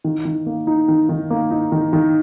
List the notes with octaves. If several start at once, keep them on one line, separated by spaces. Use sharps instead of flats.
D#3
D#3
A#3
D#4
D#3
D#3
A#3
D#4
D#3
D#3